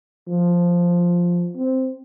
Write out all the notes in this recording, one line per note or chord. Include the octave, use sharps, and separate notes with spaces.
F3
C4